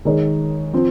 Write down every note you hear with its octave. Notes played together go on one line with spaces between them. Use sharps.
D#3 G#3 D#4 A#4 C#5
F3 C4